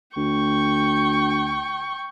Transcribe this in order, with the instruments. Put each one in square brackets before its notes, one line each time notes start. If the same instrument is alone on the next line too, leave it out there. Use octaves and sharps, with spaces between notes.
[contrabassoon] D2 [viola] G5 C#6